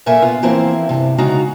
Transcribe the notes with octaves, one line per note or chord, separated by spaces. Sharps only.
F#2 A#2 A4 A#4 E5 G#5
B3 F4
E3 F3 A#3 C4 E4 C5
G2 C3
C#3 G#3 D#4 F4 F#4 A#5